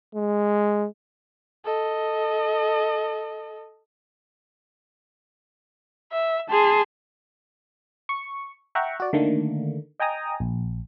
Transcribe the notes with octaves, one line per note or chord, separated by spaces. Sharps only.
G#3
A4 D#5
E5
G#4 A5 C6
C#6
E5 F#5 G5 A#5 C#6
F#4 D5
D3 D#3 A3 A#3
D#5 G5 G#5 A#5 D#6
A#1